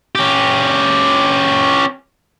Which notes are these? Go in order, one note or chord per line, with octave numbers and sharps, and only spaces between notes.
C#4 G4